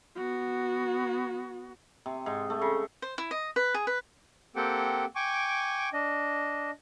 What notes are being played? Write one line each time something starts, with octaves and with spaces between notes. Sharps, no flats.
B3 F#4
C3
G#2
A3
C#3
C5
E4
D#5
B4
G#4
B4
A#3 C4 G4 A4 F#5 G5
G5 G#5 C#6 D6
D4 D#5